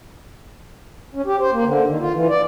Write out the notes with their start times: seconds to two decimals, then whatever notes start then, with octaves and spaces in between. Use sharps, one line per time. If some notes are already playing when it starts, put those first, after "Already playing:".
1.15 C#4
1.26 G4
1.40 C5
1.52 A#3
1.65 D3
1.86 D#3
2.00 F4
2.13 E3
2.29 D5